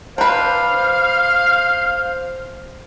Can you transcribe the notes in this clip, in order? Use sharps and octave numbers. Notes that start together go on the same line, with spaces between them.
D4 B4 C5 F5